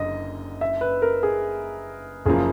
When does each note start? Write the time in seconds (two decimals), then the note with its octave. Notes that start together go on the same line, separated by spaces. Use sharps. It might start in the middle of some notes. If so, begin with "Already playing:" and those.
Already playing: F#1 F#2 D3 D#5
0.61 E5
0.81 B4
1.02 A#4
1.23 G#4
2.26 F#1 C#3 F3 A#3 G#4